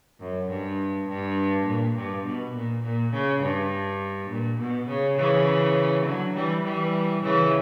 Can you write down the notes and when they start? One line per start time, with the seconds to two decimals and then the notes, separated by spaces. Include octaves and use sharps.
0.20 F#2
0.50 G2
1.08 G2
1.66 A#2
1.96 G2
2.25 B2
2.54 A#2
2.83 A#2
3.13 C#3
3.42 G2
4.30 A#2
4.59 B2
4.88 C#3
5.18 C#3 E3
6.05 D3 F#3
6.35 E3 G3
6.64 E3 G3
7.23 C#3 E3